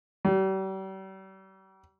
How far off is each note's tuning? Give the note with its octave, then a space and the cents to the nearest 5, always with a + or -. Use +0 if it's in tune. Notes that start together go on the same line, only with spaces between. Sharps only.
G3 -40